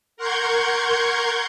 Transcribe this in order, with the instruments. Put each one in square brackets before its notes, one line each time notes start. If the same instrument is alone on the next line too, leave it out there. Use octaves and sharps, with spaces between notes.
[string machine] A#4 F#5 C6 C#6 G6 G#6